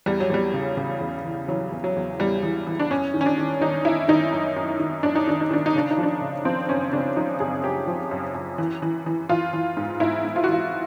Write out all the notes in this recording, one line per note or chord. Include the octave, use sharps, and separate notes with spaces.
E2 G3
F#3
E2 G3
C#3
C#3
E2
E3
E3 F#3
E2
F#3
E2
E2 G3
E3
E3
D4
F#2 C#4
D#3
C#4
D4
D#3
D#3 D#4
D#3 E4
D#3 D#4
F#2
F#2
D#3
F#2 D4
D#4
D#3 D4
D#4
D#3 D4
D#4
C#3 D4
D#4
F3
D4
C#3
F3 C4
F#2 C#4
C#3 D4
F3 D#4
F#2 G#4
F#2 G4
F3
F#2
F#2
E3
E3
E3
E3 F4
E3
G#2
G#2 E4
G#2
F4
F#4
E3 F4